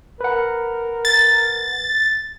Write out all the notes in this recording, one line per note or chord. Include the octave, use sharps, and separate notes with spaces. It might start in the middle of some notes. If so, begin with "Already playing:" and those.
A#4 B4 F#5
A6